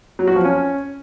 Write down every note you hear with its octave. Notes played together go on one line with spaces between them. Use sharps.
F#3
F#4
F3
C#4